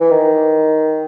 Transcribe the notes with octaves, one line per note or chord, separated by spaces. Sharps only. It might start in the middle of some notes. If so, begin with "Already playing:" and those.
E3
D#3